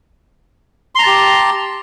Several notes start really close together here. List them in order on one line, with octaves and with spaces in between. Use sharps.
C6 A#5 A5 G4